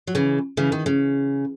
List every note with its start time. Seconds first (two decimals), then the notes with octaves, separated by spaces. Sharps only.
0.07 F#3
0.15 C#3 E3
0.57 C#3 E3
0.72 D#3
0.86 C#3